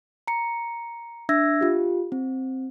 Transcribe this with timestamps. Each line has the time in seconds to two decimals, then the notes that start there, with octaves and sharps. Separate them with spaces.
0.28 A#5 C#7
1.29 D4 E5 E6 G#6 A#6
1.61 F4 G4
2.12 C4